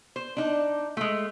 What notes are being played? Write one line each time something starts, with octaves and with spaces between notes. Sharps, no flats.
C5
D4 D#4
G#3 A3